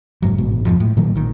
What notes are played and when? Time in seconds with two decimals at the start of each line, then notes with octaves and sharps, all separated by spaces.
0.22 F#1 G#2 F#3
0.38 A1 G#2 B2
0.66 F2 G#2 F3
0.80 A2
0.97 A#2 D#3 F#3 A#3
1.15 A#1 D#3